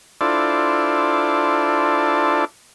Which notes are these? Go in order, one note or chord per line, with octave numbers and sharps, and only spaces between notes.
D4 E4 F4 A4 C5 D5